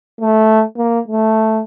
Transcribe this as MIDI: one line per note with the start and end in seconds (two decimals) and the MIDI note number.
0.21 0.62 57
0.77 1.00 58
1.08 1.61 57